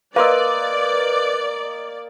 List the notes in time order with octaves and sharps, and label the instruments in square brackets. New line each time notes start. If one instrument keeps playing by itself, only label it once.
[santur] A#3 D#5 [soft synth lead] B4 [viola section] D5 [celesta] F5 C6 E6